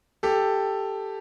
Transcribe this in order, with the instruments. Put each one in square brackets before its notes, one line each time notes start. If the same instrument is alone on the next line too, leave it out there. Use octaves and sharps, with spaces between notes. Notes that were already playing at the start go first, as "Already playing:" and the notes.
[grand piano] G4 A4